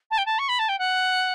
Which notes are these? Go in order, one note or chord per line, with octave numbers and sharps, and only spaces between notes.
A5
G5
A5
C#6
B5
A5
G5
F#5